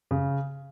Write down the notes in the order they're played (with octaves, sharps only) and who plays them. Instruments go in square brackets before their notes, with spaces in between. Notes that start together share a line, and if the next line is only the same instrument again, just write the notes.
[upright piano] C#3